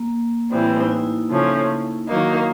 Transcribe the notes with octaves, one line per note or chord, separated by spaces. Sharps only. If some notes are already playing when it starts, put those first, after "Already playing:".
Already playing: A#3
A2 E3 G3 C4
D#4
E4
C#3 F3 A3 C#4
D#3 F#3 A#3 D#4